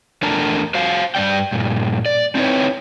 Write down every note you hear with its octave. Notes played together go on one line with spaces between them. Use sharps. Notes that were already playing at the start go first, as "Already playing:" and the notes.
E2 A3 D4 A#4 A5 A#5
F#4 C5 F5
G2 E3 D5 G5
G2 A#2
D5
C4 D#4 E4 A#4 B4 C#5